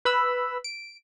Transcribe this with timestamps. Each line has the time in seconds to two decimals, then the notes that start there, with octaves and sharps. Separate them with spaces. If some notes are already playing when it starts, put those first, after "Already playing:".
0.05 B4 B5 E6
0.64 D7